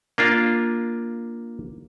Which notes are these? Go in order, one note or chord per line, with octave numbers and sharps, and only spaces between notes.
A#3 D4 F4